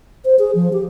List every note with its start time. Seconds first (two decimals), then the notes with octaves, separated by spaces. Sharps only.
0.25 C5
0.39 G#4
0.55 F3
0.73 G4